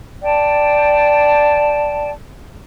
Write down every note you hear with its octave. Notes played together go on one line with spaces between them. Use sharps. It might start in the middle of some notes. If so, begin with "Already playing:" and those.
D5 G5 A5